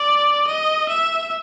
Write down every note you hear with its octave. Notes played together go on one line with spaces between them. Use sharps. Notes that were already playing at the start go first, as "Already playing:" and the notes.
Already playing: D5
D#5
E5